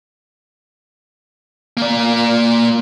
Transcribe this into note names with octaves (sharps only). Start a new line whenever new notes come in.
A#3 D5